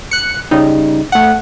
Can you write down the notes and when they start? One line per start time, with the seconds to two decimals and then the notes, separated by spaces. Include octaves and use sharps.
0.11 F#6 C#7
0.51 C#3 G3 D#4
1.12 A3 F#5